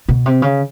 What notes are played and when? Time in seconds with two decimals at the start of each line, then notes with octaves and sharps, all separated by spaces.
0.09 B2
0.26 C3
0.42 C#3